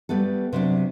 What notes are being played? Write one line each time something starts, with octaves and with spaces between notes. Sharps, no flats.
G3 A3 B3 A4
C3 F#3 D4